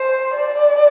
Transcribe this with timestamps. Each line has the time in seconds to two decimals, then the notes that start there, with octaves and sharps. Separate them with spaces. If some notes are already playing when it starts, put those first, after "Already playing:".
Already playing: C5
0.36 D5